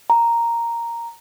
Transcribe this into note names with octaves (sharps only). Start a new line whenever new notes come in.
A#5